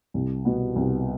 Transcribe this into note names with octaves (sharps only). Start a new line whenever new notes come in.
C2
B2 B3
C2